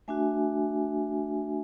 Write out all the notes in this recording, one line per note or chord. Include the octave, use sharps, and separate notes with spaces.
A3 D4 F#4 E5 G#5